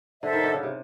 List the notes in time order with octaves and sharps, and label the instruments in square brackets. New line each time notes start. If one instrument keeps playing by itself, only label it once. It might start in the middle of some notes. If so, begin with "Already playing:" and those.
[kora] D3 [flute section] A4 C5 E5
[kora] D#3
D3
C#3
C3